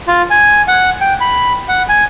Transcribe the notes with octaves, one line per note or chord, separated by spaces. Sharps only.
F4
G#5
F#5
G5
B5
F#5
G#5